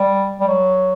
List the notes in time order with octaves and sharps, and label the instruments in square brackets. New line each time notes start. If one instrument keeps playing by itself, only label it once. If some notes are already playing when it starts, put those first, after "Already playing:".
Already playing: [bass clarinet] G3
G3
F#3